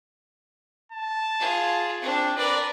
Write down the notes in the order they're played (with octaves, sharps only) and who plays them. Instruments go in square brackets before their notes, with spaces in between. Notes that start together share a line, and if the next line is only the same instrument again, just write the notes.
[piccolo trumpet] A5
[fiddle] F4 G#4
C4 D4
[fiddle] A#4 B4 [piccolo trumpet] D5